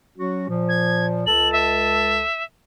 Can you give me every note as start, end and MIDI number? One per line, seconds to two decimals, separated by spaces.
0.18 0.46 54
0.18 0.46 61
0.18 0.46 66
0.49 1.23 46
0.49 1.23 53
0.69 1.06 92
1.27 2.23 37
1.27 2.23 69
1.27 2.23 81
1.27 1.51 102
1.53 2.43 76